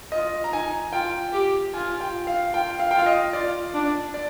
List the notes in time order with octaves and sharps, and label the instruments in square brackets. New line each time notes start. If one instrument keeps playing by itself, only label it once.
[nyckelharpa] F4 [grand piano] D#5
[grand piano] A#5
[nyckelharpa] D#4 [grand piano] G#5
[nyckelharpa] F4 [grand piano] G5
[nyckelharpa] G4
[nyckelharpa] F4 [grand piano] G#5
[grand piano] G5
F5
[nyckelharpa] F4 [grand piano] G5
[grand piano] F5
[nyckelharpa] F4 [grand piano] G5
[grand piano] F5
D#5
[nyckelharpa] F4 [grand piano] D5
[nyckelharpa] D4
[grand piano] D5